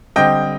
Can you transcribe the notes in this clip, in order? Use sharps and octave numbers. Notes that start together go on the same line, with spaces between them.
D3 G3 C4 D#5 G5